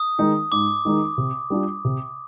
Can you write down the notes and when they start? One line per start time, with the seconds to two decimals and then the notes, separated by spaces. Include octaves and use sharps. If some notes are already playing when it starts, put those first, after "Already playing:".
Already playing: D#6
0.19 D#3 G#3 D#4
0.52 G#2 D6
0.85 D#3 G#3 D#4
1.18 C3
1.50 G3 D4 F4
1.85 C3